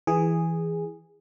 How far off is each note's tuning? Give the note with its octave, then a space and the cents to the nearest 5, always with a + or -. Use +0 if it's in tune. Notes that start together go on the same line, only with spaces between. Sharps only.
E3 +0 G#4 -10